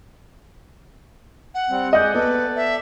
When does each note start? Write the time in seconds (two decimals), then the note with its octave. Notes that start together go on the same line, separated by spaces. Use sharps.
1.54 F#5
1.69 G3 C4
1.93 G#3 D5 D#5 F#5 G6
2.14 B3 A4 B4 D5
2.56 E5